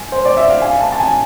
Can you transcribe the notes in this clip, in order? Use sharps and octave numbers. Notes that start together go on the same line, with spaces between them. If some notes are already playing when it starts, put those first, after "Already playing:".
Already playing: G#5
C5
D5
E5
F5
G#5
A5
A5
G#5